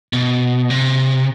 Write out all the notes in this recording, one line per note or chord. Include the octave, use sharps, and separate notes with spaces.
B2
C3